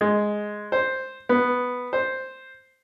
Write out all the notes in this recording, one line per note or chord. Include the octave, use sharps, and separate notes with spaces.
G#3
C5
B3
C5